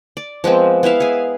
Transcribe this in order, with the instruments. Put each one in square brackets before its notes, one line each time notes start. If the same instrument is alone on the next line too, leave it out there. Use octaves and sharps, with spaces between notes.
[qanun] D5
F3 G#3 B3 C4
B3 E4 E5 F5
G#4 G#5